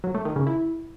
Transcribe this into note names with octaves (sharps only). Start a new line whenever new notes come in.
F#3
A3
D#3
C#3
E4